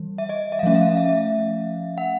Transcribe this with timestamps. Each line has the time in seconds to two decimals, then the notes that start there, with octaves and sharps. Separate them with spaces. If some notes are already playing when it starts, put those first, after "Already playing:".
Already playing: E3 G3
0.18 E5
0.29 D#5
0.52 E5
0.59 F5
0.63 F3 A3 C#4 E5
0.75 F5
0.82 E5
0.89 F5
0.97 E5
1.09 E5
1.98 F#5